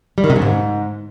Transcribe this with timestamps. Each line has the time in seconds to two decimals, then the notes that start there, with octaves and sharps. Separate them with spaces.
0.18 G3
0.24 D#3
0.30 C3
0.36 C#3
0.42 G#2